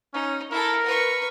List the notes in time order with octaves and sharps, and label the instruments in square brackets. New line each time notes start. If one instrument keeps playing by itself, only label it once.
[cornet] C#4 [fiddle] D#4
[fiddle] E4 A4 [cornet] A#4
[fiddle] B4 C#6